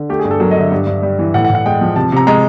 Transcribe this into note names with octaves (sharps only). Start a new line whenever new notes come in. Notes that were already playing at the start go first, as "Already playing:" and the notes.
Already playing: D3
A3 G4
G#4
G2
A4
F#3 A#4
D#5
D3 E5
G2
G2
G3
E3
A2 F#5
F#5
A2
F#5
G#3 G5
F3
C3 A5
C3 A#5
G#3 A#5